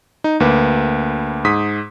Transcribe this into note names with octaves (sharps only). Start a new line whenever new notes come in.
D#4
D2 A#3 B4
G#2 D#6 B6